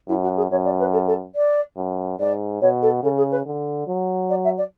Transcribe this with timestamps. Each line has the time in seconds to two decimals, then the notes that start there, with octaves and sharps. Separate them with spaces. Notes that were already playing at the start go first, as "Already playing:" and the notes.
0.08 F#2 E4
0.23 F#4
0.37 G#4
0.50 F#2 C#5
0.65 D5
0.79 B4
0.93 A4
1.07 A4
1.35 D5
1.77 F#2
2.19 G#2 D5
2.61 B2 C#5
2.82 A4
3.03 C#3 A4
3.17 G#4
3.31 B4
3.45 D3
3.87 F#3
4.29 D5
4.44 E5
4.57 D5